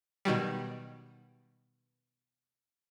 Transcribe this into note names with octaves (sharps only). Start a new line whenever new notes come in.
B2 D#3 F#3 G3